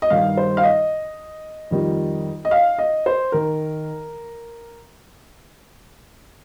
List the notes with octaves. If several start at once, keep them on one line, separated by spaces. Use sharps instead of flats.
D#5
G2 D#3 G3 F5
C5
F5
D#5
F2 D#3 G3
D#5
F5
D#5
C5
D#3 A#4